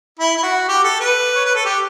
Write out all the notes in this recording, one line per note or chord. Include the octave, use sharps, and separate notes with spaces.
E4
E4
F#4
G4
A4
B4
C#5
B4
A4
G4